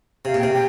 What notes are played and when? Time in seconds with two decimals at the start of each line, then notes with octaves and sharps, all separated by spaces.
0.25 C3 F5
0.34 A#2
0.39 C3 G5
0.54 G5